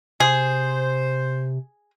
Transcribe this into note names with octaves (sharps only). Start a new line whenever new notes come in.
C3 G#4 C5